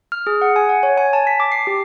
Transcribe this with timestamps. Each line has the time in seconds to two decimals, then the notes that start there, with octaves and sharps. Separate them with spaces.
0.12 F6
0.27 G#4
0.42 F#5
0.56 G#5
0.69 F#5
0.83 C#5
0.98 G#5
1.13 A5
1.27 B6
1.40 D6
1.52 C7
1.67 G4